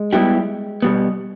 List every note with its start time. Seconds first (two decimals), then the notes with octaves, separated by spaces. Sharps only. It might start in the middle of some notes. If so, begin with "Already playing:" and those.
Already playing: G#3
0.13 G3 B3 E4 G4
0.82 B2 G3 B3